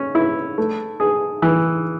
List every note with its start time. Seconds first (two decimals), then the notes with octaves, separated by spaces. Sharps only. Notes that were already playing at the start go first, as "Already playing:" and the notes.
Already playing: C#4
0.15 E4
0.58 A3
1.00 G#4
1.42 E3